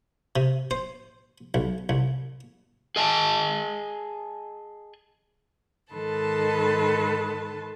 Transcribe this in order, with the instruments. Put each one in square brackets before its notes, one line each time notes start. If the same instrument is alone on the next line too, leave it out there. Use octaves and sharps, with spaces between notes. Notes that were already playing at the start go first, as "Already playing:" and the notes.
[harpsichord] C3
C5
B1
C2
[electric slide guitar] G#4 D#5 G#5 A5
[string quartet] G#2 D#3 A4 B4 A5 C6